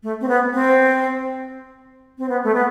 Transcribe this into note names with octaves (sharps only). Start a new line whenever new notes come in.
A3
C4
B3
C4
C4
B3
A3
B3